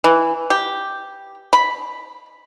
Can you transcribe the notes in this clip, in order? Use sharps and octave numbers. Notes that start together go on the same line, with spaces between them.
E3
G4
B5